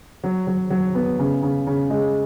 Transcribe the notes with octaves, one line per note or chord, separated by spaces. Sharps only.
F#3
F#3
F#3
B3
C#3
C#3
C#3
G#3